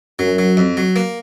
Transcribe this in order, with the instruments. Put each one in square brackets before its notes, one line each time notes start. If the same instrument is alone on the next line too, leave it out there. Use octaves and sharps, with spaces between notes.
[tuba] F#2 [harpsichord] F#3
[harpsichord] F#3
F2
F#3
A#3